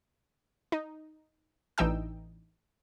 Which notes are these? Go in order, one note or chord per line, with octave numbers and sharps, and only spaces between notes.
D#4
A1 E3 D4 D#4 G5 E6